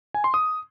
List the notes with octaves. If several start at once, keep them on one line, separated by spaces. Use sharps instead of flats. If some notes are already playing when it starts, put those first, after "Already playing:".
G#5
C6
D#6